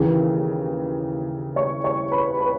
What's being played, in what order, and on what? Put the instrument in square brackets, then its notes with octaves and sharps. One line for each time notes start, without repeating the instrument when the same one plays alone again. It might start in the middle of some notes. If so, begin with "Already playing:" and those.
Already playing: [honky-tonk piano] D#2 C#3 E3
C#5 C#6
C#5 C#6
B4 B5
B4 B5